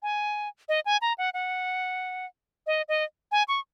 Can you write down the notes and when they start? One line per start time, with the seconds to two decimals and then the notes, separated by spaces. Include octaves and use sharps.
0.03 G#5
0.69 D#5
0.86 G#5
1.02 A#5
1.18 F#5
1.34 F#5
2.67 D#5
2.88 D#5
3.32 G#5
3.48 C#6